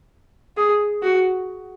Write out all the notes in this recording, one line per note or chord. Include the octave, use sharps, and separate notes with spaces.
G#4
F#4